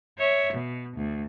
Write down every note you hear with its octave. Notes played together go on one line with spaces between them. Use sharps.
C#5 E5
B2
D2